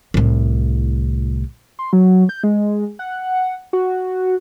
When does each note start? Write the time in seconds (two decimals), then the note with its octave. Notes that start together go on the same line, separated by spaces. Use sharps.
0.14 C2 A2
1.79 C6
1.93 F#3
2.29 G6
2.43 G#3
2.99 F#5
3.73 F#4